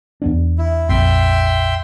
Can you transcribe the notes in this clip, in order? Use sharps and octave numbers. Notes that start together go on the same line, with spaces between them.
E2 B3 D4
E4
A#1 F2 E5 G5 C6